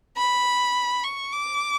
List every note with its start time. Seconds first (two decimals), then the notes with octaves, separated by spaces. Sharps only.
0.17 B5
1.04 C#6
1.32 D6